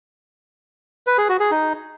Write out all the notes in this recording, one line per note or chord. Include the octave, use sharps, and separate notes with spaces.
B4
G#4
F#4
G#4
D#4